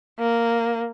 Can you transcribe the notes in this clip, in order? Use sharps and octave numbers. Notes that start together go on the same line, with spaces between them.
A#3